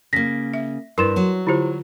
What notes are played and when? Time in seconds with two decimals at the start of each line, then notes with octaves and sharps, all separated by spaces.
0.13 C#3 A#3 A#6 B6
0.54 E5
0.98 G2 E4 A#4 B4 C6 E7
1.16 F#3 F#4
1.47 D3 E4 F4 G4 C5